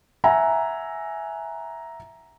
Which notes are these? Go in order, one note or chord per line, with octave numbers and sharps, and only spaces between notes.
E5 F#5 G#5 A#5